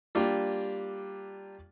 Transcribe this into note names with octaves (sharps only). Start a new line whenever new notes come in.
G3 A#3 D4 F4 G4